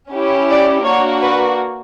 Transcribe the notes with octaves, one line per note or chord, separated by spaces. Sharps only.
C#4 E4 G4
D5
A#3 D4 F#4 C#5
B4